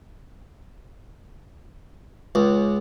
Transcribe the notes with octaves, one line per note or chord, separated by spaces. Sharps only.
C#2